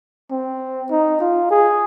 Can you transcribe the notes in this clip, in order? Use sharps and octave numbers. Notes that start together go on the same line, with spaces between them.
C4
D#4
F4
G#4